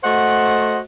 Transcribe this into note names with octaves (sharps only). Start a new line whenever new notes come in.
A3 F#4 C5 D#5 F#5